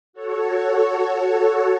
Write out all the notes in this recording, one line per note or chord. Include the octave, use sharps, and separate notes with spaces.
F#4 A4 C#5